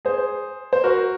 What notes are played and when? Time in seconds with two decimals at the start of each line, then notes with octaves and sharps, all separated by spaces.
0.05 G#4 C5
0.73 C5
0.84 F#4 A#4